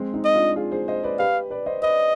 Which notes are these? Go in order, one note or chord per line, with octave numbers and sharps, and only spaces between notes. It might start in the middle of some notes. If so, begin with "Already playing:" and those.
Already playing: G#3 C4
C4 D#4
D#5
D4 F4
F4 G#4
G#4 C5
C5 D#5
B4 D5
G4 B4 F5
B4 D5
C5 D#5
B4 D5 D#5